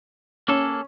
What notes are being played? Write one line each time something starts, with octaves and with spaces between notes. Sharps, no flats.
A#3 C#4 G#4 A4